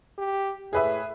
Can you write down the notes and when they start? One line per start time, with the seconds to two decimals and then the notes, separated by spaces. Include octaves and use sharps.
0.18 G4
0.73 A2 G#4 B4 E5